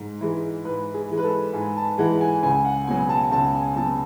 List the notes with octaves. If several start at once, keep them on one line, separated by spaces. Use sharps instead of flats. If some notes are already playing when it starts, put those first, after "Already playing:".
Already playing: G#2
E3 G#3
G#2 B4
G#4
E3 G#3
B4
A4
G#2 G#5
A5
E3 G#3 F#5
G#5
C#2 G#5
F#5
B2 F#3 G#5
A5
C#2 A5
G#5
B2 F#3 A5